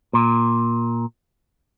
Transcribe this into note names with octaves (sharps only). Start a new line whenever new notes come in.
A#2